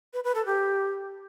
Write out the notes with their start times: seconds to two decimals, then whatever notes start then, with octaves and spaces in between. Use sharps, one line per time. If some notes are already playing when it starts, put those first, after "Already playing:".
0.13 B4
0.24 B4
0.35 A4
0.46 G4